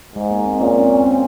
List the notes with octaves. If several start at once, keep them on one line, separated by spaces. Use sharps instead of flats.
G#2 G#3
A#3
C4
A#2 C#4
C4
C#4
C4
C4
C#4